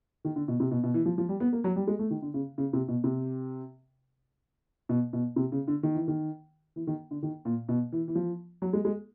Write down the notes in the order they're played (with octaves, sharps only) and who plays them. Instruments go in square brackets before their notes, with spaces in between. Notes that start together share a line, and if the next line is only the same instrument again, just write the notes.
[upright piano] D#3
D3
B2
C3
B2
B2
E3
F3
F3
G3
B3
A#3
F#3
G3
G#3
A3
D#3
D3
C#3
C#3
C3
B2
C3
B2
B2
C3
C#3
D3
D#3
E3
D#3
E3
D#3
D3
D#3
A#2
B2
E3
E3
F3
F#3
G#3
G#3